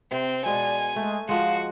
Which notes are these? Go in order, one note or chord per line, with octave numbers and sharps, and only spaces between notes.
C3 C4
B2 G#3 D5 G#5
G#3 A3
F3 G#3 F#4 F5